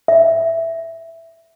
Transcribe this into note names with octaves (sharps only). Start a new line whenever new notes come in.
E5